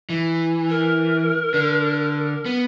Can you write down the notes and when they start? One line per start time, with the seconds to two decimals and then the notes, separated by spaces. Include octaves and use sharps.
0.09 E3
0.69 A#4
1.54 D3
2.45 B3